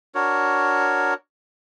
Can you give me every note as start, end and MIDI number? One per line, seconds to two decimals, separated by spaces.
0.15 1.14 62
0.15 1.14 66
0.15 1.14 70
0.15 1.14 73